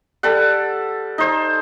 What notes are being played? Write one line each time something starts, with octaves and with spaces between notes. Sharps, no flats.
G3 A4 F#5
D#4 C5